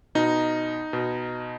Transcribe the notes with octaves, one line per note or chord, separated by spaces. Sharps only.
B2 D#4
B2